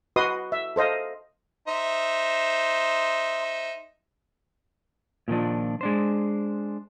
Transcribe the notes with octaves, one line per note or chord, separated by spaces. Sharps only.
F#4 B4 D#5 C6 D#6
E5
A4 C5 D#5 F5
D#4 C5 E5
A#2 D#3 F3 D4
G#3 D4 C5